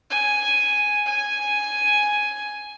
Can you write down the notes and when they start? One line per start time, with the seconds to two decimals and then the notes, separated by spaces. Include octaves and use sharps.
0.10 G#5
1.06 G#5